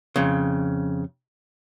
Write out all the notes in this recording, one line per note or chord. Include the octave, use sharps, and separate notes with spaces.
F2 C#3